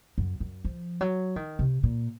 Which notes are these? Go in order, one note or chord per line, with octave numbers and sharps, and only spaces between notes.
F#2
F#2
F3
F#3
D#3
C3
A#2